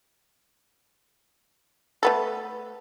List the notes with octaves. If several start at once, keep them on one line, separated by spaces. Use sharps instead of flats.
A3 B3 A4